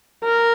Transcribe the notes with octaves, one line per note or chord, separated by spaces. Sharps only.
A#4